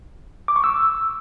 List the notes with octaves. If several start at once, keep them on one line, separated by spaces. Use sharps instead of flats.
D6
C#6
E6